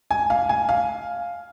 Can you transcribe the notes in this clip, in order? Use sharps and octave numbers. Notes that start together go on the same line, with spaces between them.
G#5
F5
G#5
F5